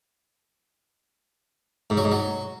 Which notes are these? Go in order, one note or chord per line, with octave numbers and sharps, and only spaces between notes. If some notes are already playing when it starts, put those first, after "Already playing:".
G#2
F#3
G#2
F#3